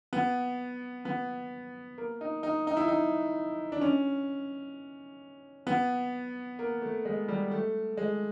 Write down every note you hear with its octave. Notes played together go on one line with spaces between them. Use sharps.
B3
B3
A#3
D#4
D#4
D#4
E4
D#4
D4
C#4
B3
A#3
A3
G#3
G3
A3
G#3